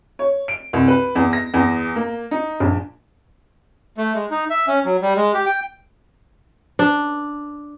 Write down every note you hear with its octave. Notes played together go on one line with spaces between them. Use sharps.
C#5
D7
C2
B4
E2
A#6
E2
A#3
D#4
A#1
A3
G#3
D#4
E5
C#4
F#3
G3
G#3
G4
G5
D4